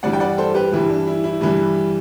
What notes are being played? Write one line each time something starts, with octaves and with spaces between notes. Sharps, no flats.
G2 E3 G3 D5 F#5
G5
D5 F#5
A4 C5
G4 B4
G2 E3 G3 E4
D4
E4
E4
G2 E3 G3 E4